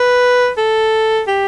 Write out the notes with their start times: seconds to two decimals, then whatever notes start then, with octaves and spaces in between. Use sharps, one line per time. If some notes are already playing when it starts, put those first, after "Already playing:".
Already playing: B4
0.57 A4
1.27 G4